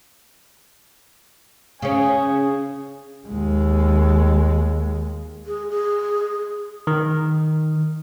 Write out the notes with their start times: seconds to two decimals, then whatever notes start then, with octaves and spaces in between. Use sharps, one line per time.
1.82 C#3 C#4 G#4
3.28 D#2 G#3
5.46 G#4
5.71 G#4
6.87 D#3